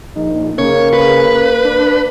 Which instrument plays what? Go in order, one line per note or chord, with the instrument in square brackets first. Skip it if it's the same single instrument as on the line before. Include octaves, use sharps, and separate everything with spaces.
[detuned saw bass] A#1 [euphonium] D#4
[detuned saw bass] C#3 [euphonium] A#3 [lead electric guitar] C#5
[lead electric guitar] B4
[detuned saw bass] D4